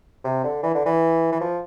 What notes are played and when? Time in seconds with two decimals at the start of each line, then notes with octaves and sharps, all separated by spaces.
0.24 C3
0.44 D3
0.63 E3
0.74 D3
0.86 E3
1.32 E3
1.41 F3